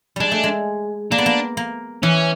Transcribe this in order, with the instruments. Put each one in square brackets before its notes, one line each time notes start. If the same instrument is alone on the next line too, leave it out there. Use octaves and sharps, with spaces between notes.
[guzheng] G3 G#3 [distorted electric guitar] D4
[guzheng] A3
G#3
[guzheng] A#3 [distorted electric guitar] D4
[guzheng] B3
A#3
A#3
[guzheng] E3 [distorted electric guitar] C#4